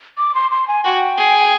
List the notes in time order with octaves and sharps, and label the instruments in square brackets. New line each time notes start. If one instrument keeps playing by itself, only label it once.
[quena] D6
C6
C6
G#5
[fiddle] F#4 [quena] G5
[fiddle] G#4